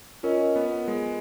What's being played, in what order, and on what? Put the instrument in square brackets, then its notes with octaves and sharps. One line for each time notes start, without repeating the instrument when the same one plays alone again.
[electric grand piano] C#4 [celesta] F4 A#4 D#5
[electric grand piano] B3
G#3